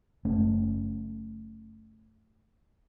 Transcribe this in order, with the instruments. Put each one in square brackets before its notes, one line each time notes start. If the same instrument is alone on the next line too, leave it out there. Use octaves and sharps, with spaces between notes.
[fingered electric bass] F#1 A3 C#4